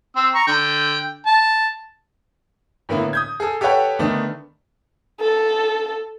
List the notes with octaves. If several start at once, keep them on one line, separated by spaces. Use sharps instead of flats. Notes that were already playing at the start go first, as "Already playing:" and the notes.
C4 E6
A#5 C#6
D3 G5
A5
A2 D3 A#3 B3 E4
D#6 G6 G#6
G#4 A4
G4 A4 B4 C#5 F#5 G5
D3 D#3 A3 B3 D4
A4